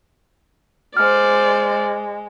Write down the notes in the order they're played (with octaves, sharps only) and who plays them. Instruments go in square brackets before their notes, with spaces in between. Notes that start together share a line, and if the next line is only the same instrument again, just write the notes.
[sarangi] G#3 [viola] C5 D5 [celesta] F6